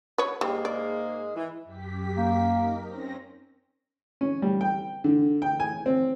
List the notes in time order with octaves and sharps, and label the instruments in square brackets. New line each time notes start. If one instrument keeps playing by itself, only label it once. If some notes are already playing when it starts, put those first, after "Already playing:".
[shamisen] B4 C#5
[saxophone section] G#2 G#3 A#3 [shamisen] G3
[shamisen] D5
[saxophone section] E3
[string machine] F#2 G4 B6
[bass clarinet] A#3
[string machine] D#4 A#4
C4 C#4 A#6
[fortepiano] C#4
G3
G5
D3
G5
G#5
C4